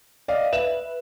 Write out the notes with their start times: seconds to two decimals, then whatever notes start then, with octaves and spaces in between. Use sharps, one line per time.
0.28 D5 D#5 F5
0.53 B4 E5 E7